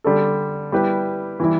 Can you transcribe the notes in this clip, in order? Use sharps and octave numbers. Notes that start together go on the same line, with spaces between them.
D3 G3 D4 A4
G3 E4 G4 B4
E3 G3 E4